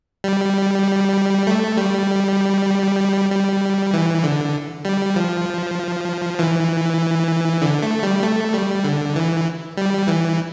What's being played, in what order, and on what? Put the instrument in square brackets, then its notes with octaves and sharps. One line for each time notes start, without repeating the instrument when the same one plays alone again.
[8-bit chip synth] G3
A3
G3
G3
E3
D3
G3
F3
E3
D3
A3
G3
A3
G3
D3
E3
G3
E3